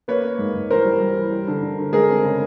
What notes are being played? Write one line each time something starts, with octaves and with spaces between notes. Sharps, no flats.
A#3 B4 C#5
A#3
G#2
G#2
E3 A#4 C5
G3
G3
E3
G3
D3
D3
D3
G#3 G#4 A#4
C4
C#3